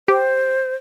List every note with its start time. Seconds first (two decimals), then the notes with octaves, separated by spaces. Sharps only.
0.08 G4 C5